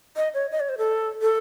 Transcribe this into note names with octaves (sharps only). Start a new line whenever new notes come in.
D#5
C#5
D#5
C#5
C5
A4
A4